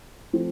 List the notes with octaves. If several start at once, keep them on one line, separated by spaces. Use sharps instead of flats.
F3 A3 C4